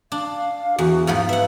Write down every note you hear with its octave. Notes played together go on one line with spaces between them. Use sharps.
D4 F5
E2 F#4
G#2 F3 B3 F5
B4 E5 F#5